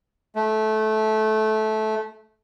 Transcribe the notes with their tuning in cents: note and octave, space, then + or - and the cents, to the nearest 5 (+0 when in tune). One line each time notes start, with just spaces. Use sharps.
A3 -20